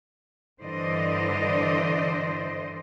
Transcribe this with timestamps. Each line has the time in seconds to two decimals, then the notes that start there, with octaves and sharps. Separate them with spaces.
0.61 G2 D3 E3 C5 D5 D#5